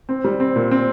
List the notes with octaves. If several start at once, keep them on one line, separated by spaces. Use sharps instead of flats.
C4
G3
C4
A#2
C4